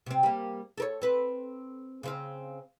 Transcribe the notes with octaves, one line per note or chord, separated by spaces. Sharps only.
C3 C4
G3 A#3
A4 A#4 C#5
C4 B4
C#3 C4 F5